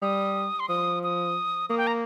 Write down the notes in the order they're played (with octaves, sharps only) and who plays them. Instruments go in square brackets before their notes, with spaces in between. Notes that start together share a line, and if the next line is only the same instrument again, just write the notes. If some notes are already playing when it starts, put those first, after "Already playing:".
[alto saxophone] G3 [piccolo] D#6
[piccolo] C6
[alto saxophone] F3 [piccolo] D#6
[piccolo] D#6
[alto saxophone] A#3 [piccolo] D#6
[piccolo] G5
A#5